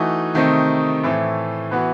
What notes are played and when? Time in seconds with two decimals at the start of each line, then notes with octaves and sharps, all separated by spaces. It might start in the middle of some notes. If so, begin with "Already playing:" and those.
Already playing: E3 A3 D#4 F#4
0.34 C3 D#3 A3 C4 D#4
1.03 A2 E3 A3 C4
1.71 E3 B3 F#4